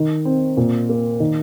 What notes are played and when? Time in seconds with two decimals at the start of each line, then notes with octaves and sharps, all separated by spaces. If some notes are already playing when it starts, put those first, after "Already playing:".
Already playing: D#3
0.25 C4
0.57 A#2
0.89 A#3
1.20 D#3